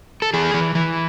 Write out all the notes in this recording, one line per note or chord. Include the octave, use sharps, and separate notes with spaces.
A4
E3 G#4
E3
E3